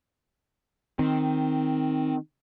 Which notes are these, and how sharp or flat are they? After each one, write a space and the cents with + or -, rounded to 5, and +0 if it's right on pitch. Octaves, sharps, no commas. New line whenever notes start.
D#3 +0 C4 +0